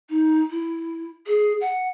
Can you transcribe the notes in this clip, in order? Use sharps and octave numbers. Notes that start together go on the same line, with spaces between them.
D#4
E4
G#4
F#5